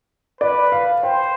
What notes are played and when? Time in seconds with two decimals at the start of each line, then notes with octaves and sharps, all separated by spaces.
0.41 B4 D5
0.72 F5
1.03 C5 G5